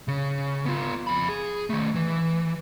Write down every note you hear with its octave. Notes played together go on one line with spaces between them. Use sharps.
C#3
B3 F4
F2 B5
G#4
D#3 A3
E3